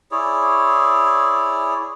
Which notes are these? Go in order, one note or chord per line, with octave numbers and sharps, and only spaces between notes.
E4 G#4 C#5 D5